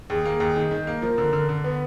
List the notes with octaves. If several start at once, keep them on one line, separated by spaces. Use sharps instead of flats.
D#2 G#4
A#3
D#2
D#3
D#3
A#3
F3 A#4
D3
D3
D3
B3 B4